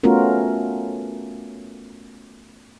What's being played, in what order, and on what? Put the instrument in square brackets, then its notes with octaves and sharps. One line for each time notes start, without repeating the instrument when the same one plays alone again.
[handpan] A3 B3 C#4 F4 F#4 A#4